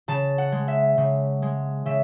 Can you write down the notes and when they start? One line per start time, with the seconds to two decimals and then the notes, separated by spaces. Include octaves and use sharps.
0.08 C#3 A5
0.38 F#5
0.52 G#3
0.68 E5
0.98 C#3
1.42 G#3
1.86 C#3 E5